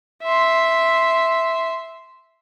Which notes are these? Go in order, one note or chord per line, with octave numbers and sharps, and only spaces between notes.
E5 C6